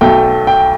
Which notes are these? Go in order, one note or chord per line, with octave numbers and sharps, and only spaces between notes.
B1 B2 A3 G5
G5